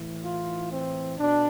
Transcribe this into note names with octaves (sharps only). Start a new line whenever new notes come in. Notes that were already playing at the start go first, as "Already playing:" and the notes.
Already playing: A2 E3
F4
C4
B2 D4